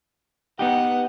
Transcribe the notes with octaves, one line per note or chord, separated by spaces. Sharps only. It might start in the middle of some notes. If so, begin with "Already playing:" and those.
B3 D#4 G4 F#5